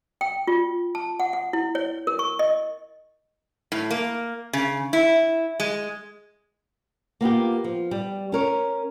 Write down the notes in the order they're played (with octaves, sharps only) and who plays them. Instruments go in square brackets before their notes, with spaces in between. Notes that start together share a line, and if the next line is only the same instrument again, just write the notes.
[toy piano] G5
F4
A5
F#5
F#5
E4
C#5
A#4
C#6
D#5
[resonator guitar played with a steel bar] A2
A#3
C#3
E4
G#3
[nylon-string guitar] A#3 B3 F4 G4
F3
G3
C#4 A#4 C#5